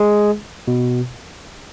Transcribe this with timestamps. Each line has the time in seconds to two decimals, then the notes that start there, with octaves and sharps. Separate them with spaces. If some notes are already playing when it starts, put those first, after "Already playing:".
Already playing: G#3 G#4
0.67 B2